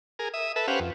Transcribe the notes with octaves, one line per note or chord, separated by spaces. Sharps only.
G#4 A#4
E5 D#6
A4 B4 E5
C#4 G4 B4 C5 F5 F#5
F2